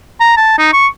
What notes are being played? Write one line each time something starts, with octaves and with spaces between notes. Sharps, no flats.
A#5
A5
D#4
C#6